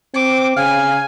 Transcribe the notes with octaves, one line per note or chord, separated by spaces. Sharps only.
C4 D6
C#3 F5 G#5